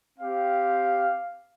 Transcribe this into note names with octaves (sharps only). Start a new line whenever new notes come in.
C4 G4 F5